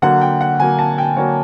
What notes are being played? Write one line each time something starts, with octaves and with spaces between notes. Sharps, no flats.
D3 F#3 A#3 F#5
G5
F#5
D3 F#3 A#3 G#5
A5
G5
D3 F#3 A#3 C#5